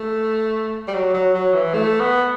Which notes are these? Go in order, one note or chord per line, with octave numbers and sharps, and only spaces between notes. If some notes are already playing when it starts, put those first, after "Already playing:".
Already playing: A3
G3
F#3
F#3
F#3
E3
A3
B3